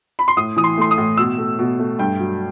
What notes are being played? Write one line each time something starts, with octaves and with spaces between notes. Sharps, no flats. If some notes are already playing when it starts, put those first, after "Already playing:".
B5
C6
A2 D#6
E3 D#6
C6
A3 C6
D#6
A2
B2 E6
A3
B2
A3
G2 G5
F#3